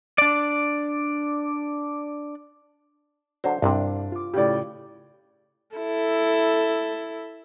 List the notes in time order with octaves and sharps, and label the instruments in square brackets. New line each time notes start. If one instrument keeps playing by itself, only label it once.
[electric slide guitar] D4 D5
[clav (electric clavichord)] D3 F#3 [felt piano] C5
[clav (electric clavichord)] C2 C3 [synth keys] G2 F5 [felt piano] D4
[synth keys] F4 D6
[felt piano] A2 C#3 [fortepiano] G4 D5
[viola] E4 A4